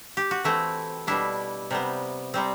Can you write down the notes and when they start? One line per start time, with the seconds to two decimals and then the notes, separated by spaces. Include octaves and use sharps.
0.17 G4
0.31 F#4
0.44 E3 A3 C4 E4
1.07 B2 G3 D4 E4
1.71 C3 G3 B3
2.34 C3 G3 C4